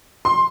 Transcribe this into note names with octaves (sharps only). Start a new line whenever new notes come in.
C6